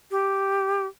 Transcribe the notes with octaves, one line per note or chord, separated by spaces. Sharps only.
G4